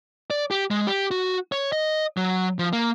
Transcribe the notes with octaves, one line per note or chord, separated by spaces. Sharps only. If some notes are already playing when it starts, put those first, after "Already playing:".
D5
G4
G#3
G4
F#4
C#5
D#5
F#3
F3
A#3